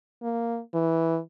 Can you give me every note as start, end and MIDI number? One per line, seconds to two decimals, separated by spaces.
0.23 0.59 58
0.74 1.19 52